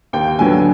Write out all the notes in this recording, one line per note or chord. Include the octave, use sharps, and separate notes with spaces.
D#2 G5
D3 F#3 B3 G#5